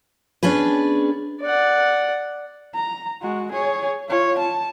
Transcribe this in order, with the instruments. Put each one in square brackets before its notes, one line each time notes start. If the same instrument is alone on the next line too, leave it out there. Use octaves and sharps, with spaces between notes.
[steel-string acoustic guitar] B3 C#4 D4 G#4 B4
[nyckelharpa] D5 F#5
[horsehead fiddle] A#5
G#3 F#4
G#4 C#5
F4 C#5
A5